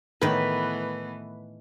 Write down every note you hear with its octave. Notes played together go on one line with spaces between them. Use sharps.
A2 D#3 E3 A3 B3 B4